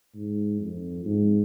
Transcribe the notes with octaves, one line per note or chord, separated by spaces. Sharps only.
G#2
F2
G#2